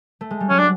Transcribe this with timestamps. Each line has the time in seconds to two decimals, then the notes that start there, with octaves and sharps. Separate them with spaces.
0.21 A3
0.31 G#3
0.40 G3
0.49 F#3 C#4
0.59 D4